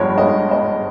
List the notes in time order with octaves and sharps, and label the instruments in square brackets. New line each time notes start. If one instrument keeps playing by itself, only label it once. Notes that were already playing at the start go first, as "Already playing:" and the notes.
Already playing: [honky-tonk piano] G1 G2 F3 G#3 [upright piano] C#5
[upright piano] D#5
D#5